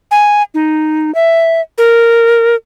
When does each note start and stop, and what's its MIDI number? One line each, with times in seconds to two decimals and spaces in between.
0.11 0.42 80
0.54 1.14 63
1.15 1.61 76
1.78 2.55 70